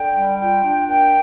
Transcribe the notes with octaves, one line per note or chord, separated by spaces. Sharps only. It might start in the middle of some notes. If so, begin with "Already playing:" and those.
Already playing: D3 G5
G3
F4 G5
D4
A#2 G5